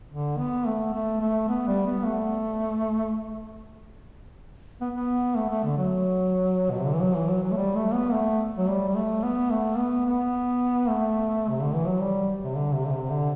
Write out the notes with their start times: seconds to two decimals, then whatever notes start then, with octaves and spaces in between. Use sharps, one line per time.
0.11 D3
0.38 B3
0.67 A3
0.94 A3
1.21 A3
1.49 B3
1.68 G3
1.86 B3
2.04 A3
4.81 B3
4.96 B3
5.36 A3
5.50 A3
5.64 D3
5.78 F#3
6.71 B2
6.79 C3
6.87 D3
6.94 E3
7.02 F#3
7.16 E3
7.30 F#3
7.43 F#3
7.52 A3
7.57 G3
7.76 A3
7.94 B3
8.13 A3
8.58 F#3
8.68 G3
8.88 G3
8.95 A3
9.24 B3
9.51 A3
9.78 B3
10.06 B3
10.89 A3
11.50 C3
11.62 D3
11.75 E3
11.87 F#3
12.00 G3
12.44 C3
12.55 D3
12.73 C3
12.85 D3
12.92 C3
13.10 D3